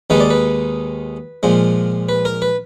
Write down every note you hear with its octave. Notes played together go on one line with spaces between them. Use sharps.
D#2 D#3 G#3 D#4 B4
D5
B4
A#2 F3 G#3
B4
A#4
B4